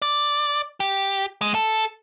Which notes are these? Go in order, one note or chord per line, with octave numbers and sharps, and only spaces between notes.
D5
G4
G#3
A4